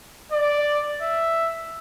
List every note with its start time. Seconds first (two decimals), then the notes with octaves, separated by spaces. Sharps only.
0.32 D5
1.02 E5